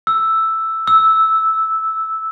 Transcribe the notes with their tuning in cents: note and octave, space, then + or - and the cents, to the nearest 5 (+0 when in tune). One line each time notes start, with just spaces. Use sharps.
E6 +0
E6 -10